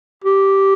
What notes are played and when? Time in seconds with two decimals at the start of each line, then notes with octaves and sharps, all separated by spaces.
0.24 G4